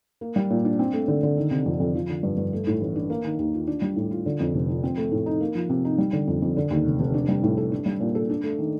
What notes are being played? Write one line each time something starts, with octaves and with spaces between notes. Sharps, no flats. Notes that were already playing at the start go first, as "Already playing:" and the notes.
A#3
G3
A#2
D4
C4
A3
D3
D3
D#3
C3
F2
F2
F3
D3
G2
G2
A3
A2
A1
D4
A#3
D#3
D#2
F4
D4
G3
A2
F4
D3
F2
F1
F3
C4
A3
A2
D#4
A#3
F3
C3
D#4
G3
D3
F2
F2
D3
D#2
F1
F1
D4
G3
A2
A4
D4
G3
A#2
A4
D4
A3
D#3